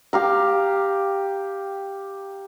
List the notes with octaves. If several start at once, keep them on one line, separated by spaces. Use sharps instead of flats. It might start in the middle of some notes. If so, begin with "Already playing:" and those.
G4 F5 A#5